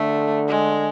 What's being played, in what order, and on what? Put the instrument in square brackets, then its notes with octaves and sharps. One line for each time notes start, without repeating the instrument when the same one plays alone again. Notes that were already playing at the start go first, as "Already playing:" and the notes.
Already playing: [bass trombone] D3 [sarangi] A3
[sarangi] G#3